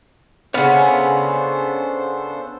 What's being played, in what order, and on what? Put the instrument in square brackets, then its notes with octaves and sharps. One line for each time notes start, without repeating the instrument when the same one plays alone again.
[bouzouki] C#3 B3 [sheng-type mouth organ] D4 A4 C5 [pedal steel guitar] C#5 F#5 F6